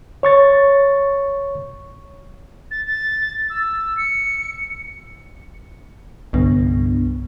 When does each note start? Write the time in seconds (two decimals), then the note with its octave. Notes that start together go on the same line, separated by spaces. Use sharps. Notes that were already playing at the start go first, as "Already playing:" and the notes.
0.23 C#5 C#6 A6
2.71 A6
2.87 A6
3.50 E6
3.97 C#7
6.33 C2 G2 D3 B3